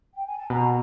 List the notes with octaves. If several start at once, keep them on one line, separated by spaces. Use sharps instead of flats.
G5
G#5
A5
B2 A#5